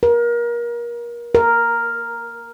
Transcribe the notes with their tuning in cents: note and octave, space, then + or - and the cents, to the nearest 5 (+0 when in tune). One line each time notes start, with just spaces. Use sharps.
A#4 +30
A#4 +0